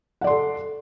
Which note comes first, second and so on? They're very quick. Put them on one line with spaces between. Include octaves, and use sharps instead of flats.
F#5 D5 C6 A4